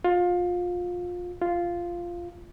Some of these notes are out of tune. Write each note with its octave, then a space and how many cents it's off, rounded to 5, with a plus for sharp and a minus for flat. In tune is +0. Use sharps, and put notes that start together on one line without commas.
F4 +25
F4 -5